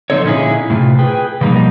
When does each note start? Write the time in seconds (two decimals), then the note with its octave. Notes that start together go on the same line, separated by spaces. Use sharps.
0.10 F3 G#3 C4 D#4 A4 C#5
0.24 A#2 D3 C#4 D#4 E4 G#4
0.70 A2 C3 F4
0.99 G#4 B4 G5
1.41 B2 F3 G3 A#3 D#4